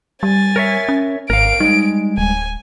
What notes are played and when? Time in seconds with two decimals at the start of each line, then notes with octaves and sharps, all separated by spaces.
0.23 G3 G#5 A6
0.56 A#4 C#5 E5
0.89 C#4
1.30 G#1 A#4 F5 D7
1.60 G3 G#3 D#4
2.18 D1 G#5